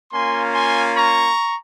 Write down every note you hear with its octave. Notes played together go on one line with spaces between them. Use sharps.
A#3 C#4 F4 G#5 C6
G#5 C6
A#5 C#6